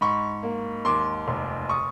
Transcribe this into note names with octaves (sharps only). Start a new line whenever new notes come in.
G#2 B5 C#6
A#3
D#2 C6 D6
F1
C#6 D#6